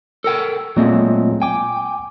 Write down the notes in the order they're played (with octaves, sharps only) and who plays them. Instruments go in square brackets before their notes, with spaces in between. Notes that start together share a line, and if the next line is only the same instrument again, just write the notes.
[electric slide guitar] A4 A#4 G5
[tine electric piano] A#2 G#3 A3 [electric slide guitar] F#3 C4
[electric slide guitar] G5 [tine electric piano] G#5 D6